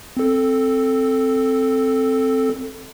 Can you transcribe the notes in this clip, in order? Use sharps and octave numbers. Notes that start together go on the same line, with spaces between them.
C4 A4